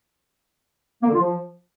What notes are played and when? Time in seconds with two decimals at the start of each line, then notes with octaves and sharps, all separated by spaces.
1.03 A#3
1.08 D3
1.13 F4
1.19 F3